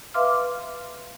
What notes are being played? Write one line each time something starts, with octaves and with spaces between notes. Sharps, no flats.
B4 E5 F5 C6 D6 F6